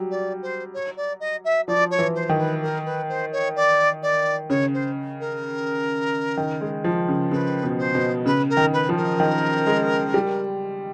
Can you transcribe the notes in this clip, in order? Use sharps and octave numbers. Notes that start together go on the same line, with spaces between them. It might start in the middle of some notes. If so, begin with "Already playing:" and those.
Already playing: F#3 G3
D5
C5
C#5
D5
D#5
E5
F3 D5
C#5
E3
C5
D#3
B4
A#4
B4
C5
C#5
D5
D5
C#3 C#5
C5
A#4
D#3
G#3
F3
C#3
C#3 B4
B2
C5
B2
C#3 B4
A#4
D#3
B4
F3
A#4
D#3
G#3
G3